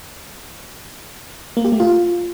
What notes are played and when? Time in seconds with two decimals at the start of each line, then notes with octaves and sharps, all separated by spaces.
1.57 A#3
1.64 G4
1.72 A3
1.80 F4